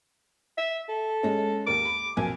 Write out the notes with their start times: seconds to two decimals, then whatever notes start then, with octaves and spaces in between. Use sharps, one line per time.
0.58 E5
0.89 A4
1.23 G#3 C#4
1.67 D#2 A#4 D6
1.85 B5
2.17 B1 F2 A#2 G#5